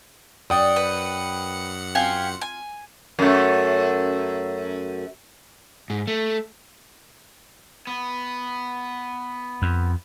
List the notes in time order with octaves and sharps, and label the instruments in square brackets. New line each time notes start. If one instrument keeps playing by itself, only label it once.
[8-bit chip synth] F#2 F#5 C#7 [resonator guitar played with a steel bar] D5 [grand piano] G5 D#6
[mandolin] B4
[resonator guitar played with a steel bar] C4 F4 [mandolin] G4 F5 G#5
[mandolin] G#5
[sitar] F#2 A3
[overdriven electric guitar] G#2
A3
B3
[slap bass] F2